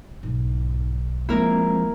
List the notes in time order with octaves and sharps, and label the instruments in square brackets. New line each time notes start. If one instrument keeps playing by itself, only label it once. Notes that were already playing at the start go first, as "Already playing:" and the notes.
[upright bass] B1 [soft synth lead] G#2
[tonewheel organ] F3 G#3 C4 [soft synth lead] A#3 [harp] E4 A#4